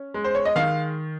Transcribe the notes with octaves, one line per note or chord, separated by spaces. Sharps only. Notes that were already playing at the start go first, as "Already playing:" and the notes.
Already playing: C#4
G#3
C5
C#5
D#5
D#3 F5